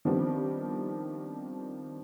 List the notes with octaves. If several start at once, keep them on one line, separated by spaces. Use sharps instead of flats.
D#3 F3 G3 B3 C4 D4